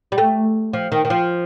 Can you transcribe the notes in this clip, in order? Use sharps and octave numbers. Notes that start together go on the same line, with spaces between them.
G3
A3
F3
D#3
D#3
F3